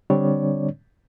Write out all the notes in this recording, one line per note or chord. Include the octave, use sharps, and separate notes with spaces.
D3 G3 C4 D4 C#5 D5